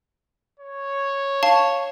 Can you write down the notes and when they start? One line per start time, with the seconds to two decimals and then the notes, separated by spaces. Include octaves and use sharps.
0.59 C#5
1.43 F5 A5 C#6